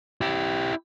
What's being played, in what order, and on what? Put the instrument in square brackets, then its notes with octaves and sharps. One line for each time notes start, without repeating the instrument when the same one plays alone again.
[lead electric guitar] E4 G4